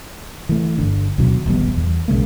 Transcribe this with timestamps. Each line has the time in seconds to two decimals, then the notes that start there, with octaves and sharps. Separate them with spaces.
0.49 E3 A3
0.78 G1 D3
1.18 D2 B2 D3 F#3
1.46 D#1 A#1 G3 B3
1.77 E2
2.08 B1 C#3 G#3 A#3